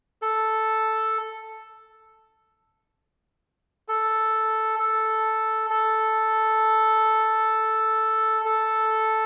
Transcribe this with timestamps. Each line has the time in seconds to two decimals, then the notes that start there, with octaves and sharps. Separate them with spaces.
0.22 A4
3.88 A4
4.79 A4
5.70 A4
8.45 A4